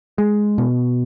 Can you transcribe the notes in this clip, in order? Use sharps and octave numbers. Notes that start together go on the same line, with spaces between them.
G#3
B2